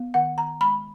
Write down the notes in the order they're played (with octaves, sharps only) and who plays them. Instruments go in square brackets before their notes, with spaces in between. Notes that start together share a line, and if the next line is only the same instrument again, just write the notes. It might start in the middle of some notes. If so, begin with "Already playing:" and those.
Already playing: [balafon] B3
D#3 F#5
D#3 A#5
G#3 B5